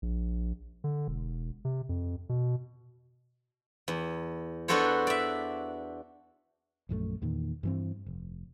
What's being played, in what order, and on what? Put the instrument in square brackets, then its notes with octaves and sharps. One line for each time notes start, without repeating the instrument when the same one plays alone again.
[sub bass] A#1
D3
E1
C3
F2
B2
[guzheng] E2
B3 D4 F#4 A4 C5 C#5
D5 E5
[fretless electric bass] A#1 F#2 E3 A3
E2 A#2 D#3
G2 E3 C4
F1